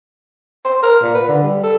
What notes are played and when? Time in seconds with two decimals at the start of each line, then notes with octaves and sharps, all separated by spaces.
0.65 C5
0.82 A#4
1.02 A#2
1.15 B4
1.28 D3
1.43 G3
1.63 A4